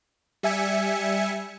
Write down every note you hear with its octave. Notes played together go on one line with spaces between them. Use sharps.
G3 E5 G#5 C#7